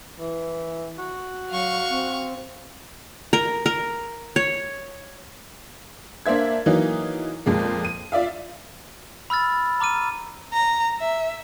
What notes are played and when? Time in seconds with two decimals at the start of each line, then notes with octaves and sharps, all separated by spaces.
0.19 E3
0.98 F#4
1.50 F#3 F5 C#6
1.90 C4
3.33 A#4
3.66 A#4
4.36 C#5
6.26 A#3 D4 C5 E5 G#6
6.66 E3 F#3 A#3 D#4
7.46 F2 A#2 G#3 A#3
7.85 D#7
8.12 F4 D5 E5 F5
9.30 B5 E6 F6 A6
9.80 A#5 D6 F6 D#7
10.53 A#5
11.00 E5